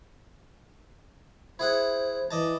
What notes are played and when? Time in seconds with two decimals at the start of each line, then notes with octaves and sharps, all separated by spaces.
1.59 E4 G#4 C5 F#5
2.31 E3 D5 D#5 A5